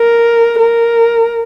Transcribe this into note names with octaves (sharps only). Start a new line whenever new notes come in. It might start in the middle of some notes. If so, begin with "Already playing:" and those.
Already playing: A#4
A#4